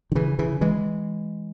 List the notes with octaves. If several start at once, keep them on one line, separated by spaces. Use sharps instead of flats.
D#3
C#3 E3
C#3 E3
E3 G#3